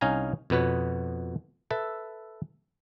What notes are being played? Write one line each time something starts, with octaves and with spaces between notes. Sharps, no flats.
C2 C#4 D#4 F5 G#5 A#5
F2 B2 B3 B4 C#5
A4 B4 E5